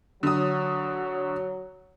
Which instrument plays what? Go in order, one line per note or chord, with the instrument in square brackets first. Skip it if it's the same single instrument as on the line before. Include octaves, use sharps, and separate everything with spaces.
[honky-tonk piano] D3 D#6 [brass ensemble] F#3